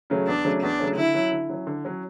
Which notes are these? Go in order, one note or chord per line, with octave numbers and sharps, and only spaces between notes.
C#3 F#3 A3 C#4
E2 D4
C#3 F#3 A3 C#4
E2 D4
C#3 F#3 A3 C#4
D3 E4
F#3 C#4
D3
F#3 C#4
D3
F#3 C#4